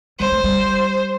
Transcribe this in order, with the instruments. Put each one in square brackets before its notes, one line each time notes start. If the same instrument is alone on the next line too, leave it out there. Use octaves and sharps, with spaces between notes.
[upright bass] G3 [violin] C5
[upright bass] A3
G3